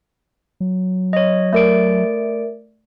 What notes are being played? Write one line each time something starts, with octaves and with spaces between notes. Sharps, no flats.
F#3
C#5 D#5
A3 A#4 D5 E5 D7